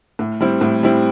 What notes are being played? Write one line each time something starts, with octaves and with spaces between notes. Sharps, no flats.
A2
G3 C4 E4
A2
G3 C4 E4